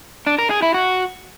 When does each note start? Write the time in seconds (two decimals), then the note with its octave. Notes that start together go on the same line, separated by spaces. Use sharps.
0.27 D4
0.38 A#4
0.50 G#4
0.62 E4
0.74 F#4